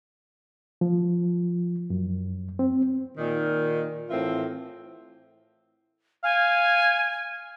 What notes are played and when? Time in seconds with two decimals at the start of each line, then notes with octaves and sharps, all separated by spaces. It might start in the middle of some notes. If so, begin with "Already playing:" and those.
0.81 F3
1.90 F#2
2.59 C4
3.18 A#2 D#3
4.10 A2 E3 C4 F4 A#4 E5
6.24 F5 G#5